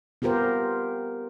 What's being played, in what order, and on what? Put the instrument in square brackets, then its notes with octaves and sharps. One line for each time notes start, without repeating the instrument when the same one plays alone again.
[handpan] B3 F4 G4 A#4 C5